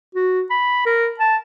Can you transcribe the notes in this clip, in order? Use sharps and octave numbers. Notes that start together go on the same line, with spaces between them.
F#4
B5
A#4
A5